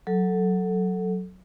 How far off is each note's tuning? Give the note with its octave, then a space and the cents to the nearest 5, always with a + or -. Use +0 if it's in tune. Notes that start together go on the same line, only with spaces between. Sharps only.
F#3 +0 A4 +0